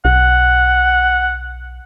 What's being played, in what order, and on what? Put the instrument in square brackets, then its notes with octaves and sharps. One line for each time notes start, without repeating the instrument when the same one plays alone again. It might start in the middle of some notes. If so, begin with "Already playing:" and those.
[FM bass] B1 [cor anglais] F#5